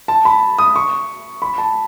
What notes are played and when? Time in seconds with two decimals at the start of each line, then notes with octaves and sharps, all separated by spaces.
0.08 A5
0.25 B5
0.58 D#6
0.76 C#6
1.42 B5
1.58 A5